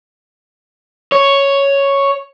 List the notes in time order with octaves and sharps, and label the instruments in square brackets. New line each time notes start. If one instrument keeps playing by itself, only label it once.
[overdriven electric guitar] C#5